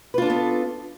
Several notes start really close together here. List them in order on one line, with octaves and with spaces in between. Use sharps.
B4 F4 D4 A4 B3